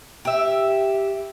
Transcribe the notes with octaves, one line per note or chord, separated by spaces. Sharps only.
G4 E5